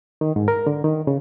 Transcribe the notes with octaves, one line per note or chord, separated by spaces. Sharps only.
D#3
G#2
A#4
D3
D#3
C#3